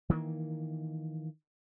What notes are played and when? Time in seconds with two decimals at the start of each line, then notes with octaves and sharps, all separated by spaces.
0.09 D#3 E3 A3 A#3